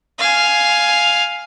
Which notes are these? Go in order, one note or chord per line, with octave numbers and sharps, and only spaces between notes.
F5 G#5